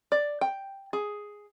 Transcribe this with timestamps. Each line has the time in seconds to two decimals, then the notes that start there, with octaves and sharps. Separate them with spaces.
0.12 D5
0.41 G5
0.93 G#4